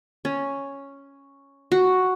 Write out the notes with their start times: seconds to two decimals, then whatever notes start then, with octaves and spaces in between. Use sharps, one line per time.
0.25 C#4
1.72 F#4